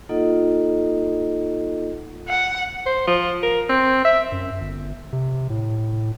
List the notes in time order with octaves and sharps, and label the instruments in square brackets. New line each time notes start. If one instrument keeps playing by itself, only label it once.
[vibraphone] A#3 D#4 F4 A4 D#5 F#5
[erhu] F#5
[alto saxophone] C5
F3
A#4
C4
E5
[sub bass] F#2
G1
C3
A2